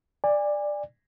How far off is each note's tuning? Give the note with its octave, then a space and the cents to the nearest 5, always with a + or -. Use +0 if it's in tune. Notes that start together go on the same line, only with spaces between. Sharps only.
D5 +10 G#5 -30